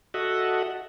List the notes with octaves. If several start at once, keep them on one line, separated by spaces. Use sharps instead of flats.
F#4 A4 D#5 E5 F#5